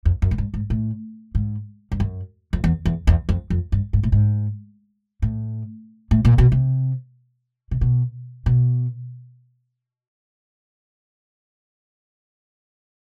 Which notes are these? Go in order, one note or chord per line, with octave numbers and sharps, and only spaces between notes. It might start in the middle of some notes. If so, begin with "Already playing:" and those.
F2
F#2
G#2
G2
G#2
A2
G#2
G2
F#2
F2
E2
E2
E2
F2
F2
G2
G#2
A2
G#2
A2
A2
A#2
B2
C3
C3
B2
B2